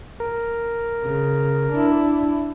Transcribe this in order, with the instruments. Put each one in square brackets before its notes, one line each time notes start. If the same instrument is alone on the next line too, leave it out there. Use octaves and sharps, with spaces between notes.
[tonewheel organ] A#4
[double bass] C#3
D4 E4